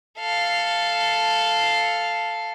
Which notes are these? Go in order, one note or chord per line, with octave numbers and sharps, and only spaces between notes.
A4 F5